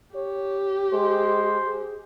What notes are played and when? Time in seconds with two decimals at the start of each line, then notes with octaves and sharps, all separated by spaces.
0.15 G4 C#5
0.93 G#3 C5
1.67 G#4